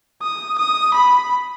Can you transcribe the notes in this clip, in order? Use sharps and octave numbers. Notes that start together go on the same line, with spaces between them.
D#6
D#6
B5